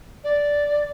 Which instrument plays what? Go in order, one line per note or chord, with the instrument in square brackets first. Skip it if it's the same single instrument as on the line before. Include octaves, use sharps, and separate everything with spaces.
[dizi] D5